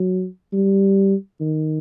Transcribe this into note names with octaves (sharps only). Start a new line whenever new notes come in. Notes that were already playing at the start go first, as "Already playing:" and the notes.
Already playing: F#3
G3
D#3